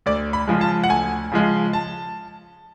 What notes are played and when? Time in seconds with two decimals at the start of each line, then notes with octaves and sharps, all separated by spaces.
0.06 D2 D5
0.33 B5
0.47 C#3 F3 G#3
0.61 A5
0.84 F#5
0.89 D2 G#5
1.32 C#3 F3 G#3
1.73 A5